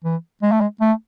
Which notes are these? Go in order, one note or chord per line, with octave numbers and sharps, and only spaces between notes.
E3
G#3
A3
G#3
A3